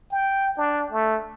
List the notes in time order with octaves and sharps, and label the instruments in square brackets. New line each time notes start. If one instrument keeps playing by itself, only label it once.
[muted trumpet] G5
D4
A3